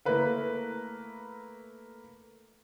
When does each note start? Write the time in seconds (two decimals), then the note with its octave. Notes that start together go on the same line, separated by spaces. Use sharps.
0.05 A3 A#3 E4 A#4 B4 F5